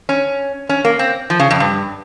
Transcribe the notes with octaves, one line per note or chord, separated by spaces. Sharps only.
C#4
C#4
A#3
C4
F3
C#3
F2
G2